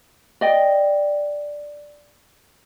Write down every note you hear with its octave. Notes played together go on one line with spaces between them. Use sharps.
D5 D#5 G5